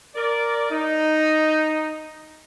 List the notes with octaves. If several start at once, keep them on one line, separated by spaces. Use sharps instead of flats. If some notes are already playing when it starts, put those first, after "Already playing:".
A#4 D5
D#4